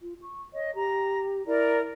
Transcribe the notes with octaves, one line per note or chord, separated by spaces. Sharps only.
F4
C#6
C#5 D#5
G4 A#5
E4 A#4 D5 A#5